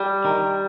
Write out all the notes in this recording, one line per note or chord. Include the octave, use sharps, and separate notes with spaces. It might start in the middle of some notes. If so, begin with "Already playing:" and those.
Already playing: G3
D#3